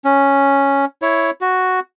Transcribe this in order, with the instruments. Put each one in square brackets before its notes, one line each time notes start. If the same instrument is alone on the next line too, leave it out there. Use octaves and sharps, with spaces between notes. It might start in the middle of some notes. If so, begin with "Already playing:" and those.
[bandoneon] C#4
E4 C#5
F#4